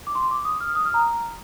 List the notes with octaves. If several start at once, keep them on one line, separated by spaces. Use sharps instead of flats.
D6
C6
D6
D#6
F6
D#6
F6
A#5